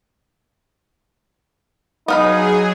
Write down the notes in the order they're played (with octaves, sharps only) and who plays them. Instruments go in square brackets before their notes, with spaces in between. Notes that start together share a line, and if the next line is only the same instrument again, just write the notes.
[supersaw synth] F#3 G#4 [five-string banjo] B3 F5 B5 [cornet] D#4